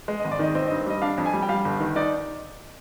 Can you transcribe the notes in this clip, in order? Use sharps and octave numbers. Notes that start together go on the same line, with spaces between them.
G#3
D#5
G#1
D5
D#3 D#5
C4 D#5
D#5
G2
G3 D#5
D4 F5
F2
G#5
G3
G5
G3 F5
G1
D#3
D#4 D5